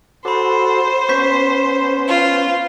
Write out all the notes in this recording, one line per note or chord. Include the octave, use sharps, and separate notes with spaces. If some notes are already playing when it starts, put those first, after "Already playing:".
F#4 A4 C5 B5 D6
B3 C#4 C#6 G6 B6
F4